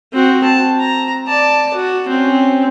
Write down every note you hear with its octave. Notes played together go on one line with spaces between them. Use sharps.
C4 F#4
A5
A#5
D5 A5
F#4
C4 C#4